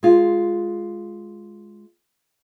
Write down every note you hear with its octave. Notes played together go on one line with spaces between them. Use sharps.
G#3 F4